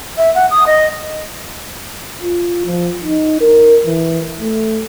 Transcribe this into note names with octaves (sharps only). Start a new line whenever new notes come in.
E5
F#5
D#6
D#5
F4
F3
D#4
A#4
E3
A3